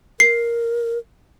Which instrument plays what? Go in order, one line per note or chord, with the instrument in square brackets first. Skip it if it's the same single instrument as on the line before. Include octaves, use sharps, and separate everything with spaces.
[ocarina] A#4 [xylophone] C7